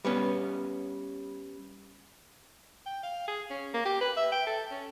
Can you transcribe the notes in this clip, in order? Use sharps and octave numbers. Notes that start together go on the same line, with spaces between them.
G3 B3 C#4
G5
F5
G#4
C#4
A#3
G4
B4
E5
G5
A4
C#4